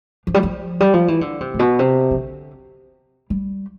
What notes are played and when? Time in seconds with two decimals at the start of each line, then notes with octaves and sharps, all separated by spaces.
0.27 F3
0.34 G3
0.43 F3
0.80 G3
0.93 F3
1.08 E3
1.21 D3
1.40 C3
1.54 A2
1.59 B2
1.79 C3
2.11 E3
2.16 D3
3.30 G3